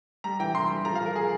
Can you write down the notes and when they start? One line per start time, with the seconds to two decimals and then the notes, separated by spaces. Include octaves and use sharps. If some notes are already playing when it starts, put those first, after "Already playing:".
0.24 G3 A#5
0.40 E3 G5
0.55 E3 C6
0.70 G3
0.85 F3 A#5
0.95 F5
1.01 F3
1.06 A#4
1.15 G#4